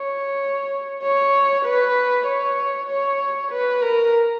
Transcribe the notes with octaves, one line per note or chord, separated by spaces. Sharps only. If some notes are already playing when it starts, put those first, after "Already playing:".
Already playing: C#5
C#5
B4
C#5
C#5
B4
A#4